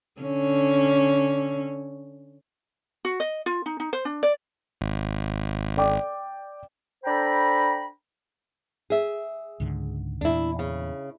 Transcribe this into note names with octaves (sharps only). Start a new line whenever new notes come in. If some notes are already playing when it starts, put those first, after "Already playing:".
D3 C#4
F#4
D#5
F4
D#4
D#4
C5
D4
D5
G#1
D5 G5 D6
D4 A4 C5 G5 A#5 B5
G#4 E5
C#2 G#2 D3
E2 A#2 D4 E4
C#3